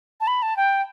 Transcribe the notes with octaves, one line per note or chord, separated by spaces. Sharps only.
A5
B5
A5
G5